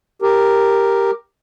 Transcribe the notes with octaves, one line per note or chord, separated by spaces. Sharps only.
G4 A#4